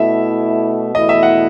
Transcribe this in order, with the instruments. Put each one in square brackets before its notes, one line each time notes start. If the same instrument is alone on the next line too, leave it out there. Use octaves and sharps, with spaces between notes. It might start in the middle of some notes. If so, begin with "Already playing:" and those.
Already playing: [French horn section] B2 A3 E4 [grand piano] E5
[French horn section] E2 B2 A3 E4 [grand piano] D#5
[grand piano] E5
F#5